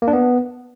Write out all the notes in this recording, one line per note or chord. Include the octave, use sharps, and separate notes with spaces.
A#3
D4
B3